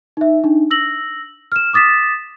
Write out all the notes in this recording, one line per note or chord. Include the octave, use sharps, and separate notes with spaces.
D#4 E5
D4 D#4
E6 A#6 F#7
F6 E7
D6 D#6 A6 B6 E7